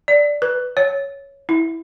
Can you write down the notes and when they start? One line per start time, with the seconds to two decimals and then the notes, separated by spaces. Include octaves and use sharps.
0.08 D5
0.42 B4
0.77 C#5
1.49 E4